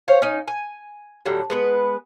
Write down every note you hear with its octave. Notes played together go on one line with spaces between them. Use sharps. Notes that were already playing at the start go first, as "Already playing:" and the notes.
C5 C#5 F5
C#4 D#4
G#5
A2 D3 F#3 G3
G#3 B3 B4